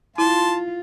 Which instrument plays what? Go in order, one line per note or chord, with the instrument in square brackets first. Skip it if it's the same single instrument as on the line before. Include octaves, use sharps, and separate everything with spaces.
[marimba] E4 [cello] F4 [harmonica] A5 C6